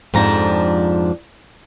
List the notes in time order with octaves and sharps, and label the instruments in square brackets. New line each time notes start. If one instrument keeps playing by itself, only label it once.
[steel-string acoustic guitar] F2 G#2 F3 D4 G4 A#5